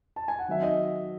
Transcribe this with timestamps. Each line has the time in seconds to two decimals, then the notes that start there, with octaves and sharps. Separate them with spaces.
0.16 A5
0.28 G#5
0.39 F#5
0.48 D#3 F#3 C4 D#4 E5
0.62 D#5